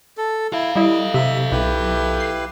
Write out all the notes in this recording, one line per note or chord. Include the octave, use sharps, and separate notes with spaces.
A4
E4 A4 F5
G3 E4 D#5
C3 E5
B1 E4 G4 B4
C7